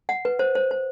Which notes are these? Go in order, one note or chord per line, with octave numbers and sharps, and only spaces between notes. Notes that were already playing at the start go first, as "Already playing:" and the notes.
F#5
B4
C5
C5
C5